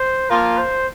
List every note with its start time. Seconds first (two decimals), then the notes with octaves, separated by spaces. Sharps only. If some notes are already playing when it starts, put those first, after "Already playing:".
Already playing: C5
0.29 F3 A#3 F4 A#4
0.58 C5